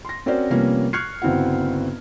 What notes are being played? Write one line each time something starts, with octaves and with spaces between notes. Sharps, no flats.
C6 A#6
C4 C#4 F#4 A#4 C5 D5
C3 F3 G3 A#3 B3 C#4
C#6 F6 F#6 G#6 C7 C#7
G1 C#3 C4 E4 F#4 F#5